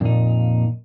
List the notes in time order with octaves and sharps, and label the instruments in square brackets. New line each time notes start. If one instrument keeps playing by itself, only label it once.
[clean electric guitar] F2 D#4 [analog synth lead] A#2